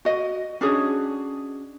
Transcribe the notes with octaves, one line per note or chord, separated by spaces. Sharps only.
F#4 D#5
C#4 D4 F#4 G#4